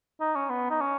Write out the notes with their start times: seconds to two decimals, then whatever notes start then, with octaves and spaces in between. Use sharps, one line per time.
0.21 D#4
0.35 C#4
0.50 B3
0.71 D#4
0.81 C#4